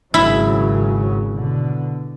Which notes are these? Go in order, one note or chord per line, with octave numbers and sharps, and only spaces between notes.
G#1 C#3 F#3 E4
B2 D3